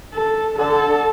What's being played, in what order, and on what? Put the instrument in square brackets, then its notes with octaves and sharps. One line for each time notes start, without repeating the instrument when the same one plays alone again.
[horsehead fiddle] A4
[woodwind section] D3 [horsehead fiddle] A4